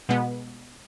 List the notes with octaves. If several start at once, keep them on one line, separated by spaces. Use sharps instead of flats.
B2 G#3 B3